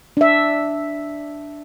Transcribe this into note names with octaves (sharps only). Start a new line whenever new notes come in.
D4 E5